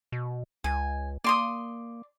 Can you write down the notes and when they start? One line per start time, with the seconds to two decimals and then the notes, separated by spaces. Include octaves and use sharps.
0.12 B2
0.64 C#2 G#5
1.24 A#3 D5 C6 D#6